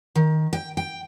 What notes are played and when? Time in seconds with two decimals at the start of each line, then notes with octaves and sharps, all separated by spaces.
0.15 D#3
0.53 G5
0.77 G5